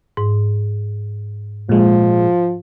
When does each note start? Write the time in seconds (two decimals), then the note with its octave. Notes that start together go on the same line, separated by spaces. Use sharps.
0.17 G#2
1.69 A#2 F3 G#3